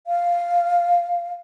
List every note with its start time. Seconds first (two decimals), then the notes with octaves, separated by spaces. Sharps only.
0.07 F5